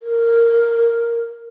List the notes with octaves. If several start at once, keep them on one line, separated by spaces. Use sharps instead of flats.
A#4